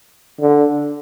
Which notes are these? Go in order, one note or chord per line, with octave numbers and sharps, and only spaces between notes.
D3